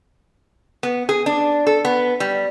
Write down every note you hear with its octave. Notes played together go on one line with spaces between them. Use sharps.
B3
G#4
D4
A4
B3
G3